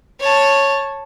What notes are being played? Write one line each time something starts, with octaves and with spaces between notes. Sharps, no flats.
C#5 A5